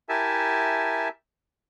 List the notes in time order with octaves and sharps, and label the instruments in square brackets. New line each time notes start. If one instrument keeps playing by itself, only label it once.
[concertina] E4 G4 A#4 E5 G#5 A5